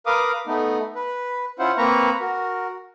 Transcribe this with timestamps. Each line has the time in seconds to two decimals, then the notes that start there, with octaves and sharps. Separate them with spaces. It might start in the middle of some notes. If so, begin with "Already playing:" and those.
0.06 A#4 B4 F5 D6 D#6
0.47 A3 B3 D#4
0.95 B4
1.59 C#4 E4 F4 C5 F#5
1.78 A#3 C4 B4 A#5 C#6
2.20 F#4 A#4